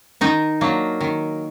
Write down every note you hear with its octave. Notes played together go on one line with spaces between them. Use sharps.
D#3 D#4
F#3 A#3 D4
D#3